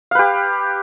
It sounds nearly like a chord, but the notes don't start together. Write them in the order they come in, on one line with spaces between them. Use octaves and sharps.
F5 B4 G4